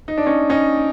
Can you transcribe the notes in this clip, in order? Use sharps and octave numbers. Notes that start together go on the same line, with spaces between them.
D#4
D4
C#4 D#4
C#4 D#4